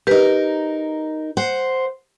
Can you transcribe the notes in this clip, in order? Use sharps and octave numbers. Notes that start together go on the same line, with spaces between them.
D#4 G4 A#4 B4
C5 F#5